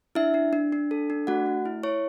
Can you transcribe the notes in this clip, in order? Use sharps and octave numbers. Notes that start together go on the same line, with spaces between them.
D4 E4 E5
D4
D4
D4
A4
D4
A3 F#4 F#5
A3
E4
E4 C#5 C#6